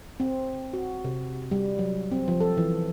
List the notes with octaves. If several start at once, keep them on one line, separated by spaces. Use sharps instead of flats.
C4
F#4
C3
G3
F#3
C4
F3
A4
E3